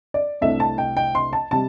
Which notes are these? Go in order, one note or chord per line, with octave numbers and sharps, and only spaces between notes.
D5
C2 C3 A3 D4 E5
A5
G5
G5
C6
A5
C3 G3 A5